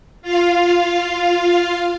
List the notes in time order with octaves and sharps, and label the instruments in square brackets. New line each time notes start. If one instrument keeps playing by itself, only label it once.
[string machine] F4 F5